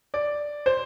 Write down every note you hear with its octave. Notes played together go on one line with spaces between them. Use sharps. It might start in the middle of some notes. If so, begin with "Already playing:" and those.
D5
C5